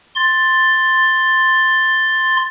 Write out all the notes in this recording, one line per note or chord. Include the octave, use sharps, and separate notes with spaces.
C6 A6